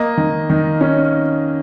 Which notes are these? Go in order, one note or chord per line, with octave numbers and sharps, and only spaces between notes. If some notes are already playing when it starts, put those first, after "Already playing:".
Already playing: A#3 D#5
D#3
D#3
C#4